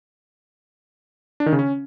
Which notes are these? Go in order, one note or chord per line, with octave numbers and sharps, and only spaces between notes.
D4
D#3
C#3
C#4